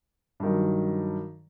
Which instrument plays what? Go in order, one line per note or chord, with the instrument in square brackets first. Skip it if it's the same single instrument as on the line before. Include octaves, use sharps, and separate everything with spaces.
[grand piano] G2 D#3 F#3